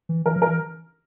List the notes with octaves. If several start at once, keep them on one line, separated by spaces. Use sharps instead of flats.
E3
E3 A#4
F3
A#4
E3